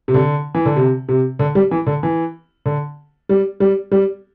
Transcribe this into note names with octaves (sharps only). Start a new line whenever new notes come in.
C3
D3
E3
D3
C3
C3
D3
G3
E3
D3
E3
D3
G3
G3
G3